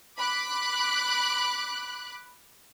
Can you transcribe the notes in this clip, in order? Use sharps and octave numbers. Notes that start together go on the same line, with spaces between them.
B5 D6 F#6